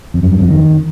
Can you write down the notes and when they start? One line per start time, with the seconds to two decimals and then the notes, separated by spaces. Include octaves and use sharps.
0.14 F2
0.23 F#2
0.32 G2
0.41 F2
0.50 D#3